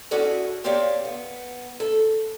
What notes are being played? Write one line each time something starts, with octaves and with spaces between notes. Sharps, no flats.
C#4 E4 F#4 G#4 A4 D5
A#3 C4 G4 C#5 D5 F5
B3
A4